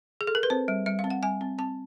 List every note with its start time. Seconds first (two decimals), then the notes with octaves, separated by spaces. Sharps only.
0.21 G#4
0.27 A4
0.35 A#4
0.43 B4
0.50 C4 C5
0.68 G3
0.86 G3 E5
0.99 F5
1.04 C4
1.10 F#5
1.22 G3 G#5
1.41 C4
1.58 C4 A5